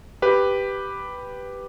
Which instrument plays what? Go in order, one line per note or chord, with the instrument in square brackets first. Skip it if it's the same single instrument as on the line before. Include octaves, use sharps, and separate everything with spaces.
[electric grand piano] G4 B4